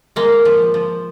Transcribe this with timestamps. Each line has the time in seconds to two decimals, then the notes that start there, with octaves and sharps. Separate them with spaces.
0.16 G#3 A#3
0.45 F3
0.74 F3